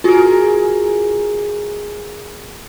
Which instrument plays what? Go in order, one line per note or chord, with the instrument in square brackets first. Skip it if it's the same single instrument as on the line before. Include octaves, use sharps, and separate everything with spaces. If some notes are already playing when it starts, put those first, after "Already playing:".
[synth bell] F4 F#4 [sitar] G#4 A#4